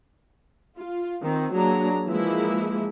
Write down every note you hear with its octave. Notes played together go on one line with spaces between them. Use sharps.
F4
D#3 C4
F#3 A#3 D4 G#4 A#5
E3 F3 G#3 A#3 E4